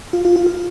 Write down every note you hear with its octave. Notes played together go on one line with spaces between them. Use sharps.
F4
F4
F4
F4